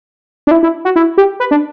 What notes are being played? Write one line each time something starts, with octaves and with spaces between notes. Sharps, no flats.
D4
E4
E4
F#4
E4
G4
B4
D4